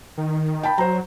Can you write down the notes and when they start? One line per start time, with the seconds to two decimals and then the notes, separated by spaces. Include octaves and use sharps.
0.17 D#3
0.63 G5 A5 B5
0.78 F#3 C5 A#5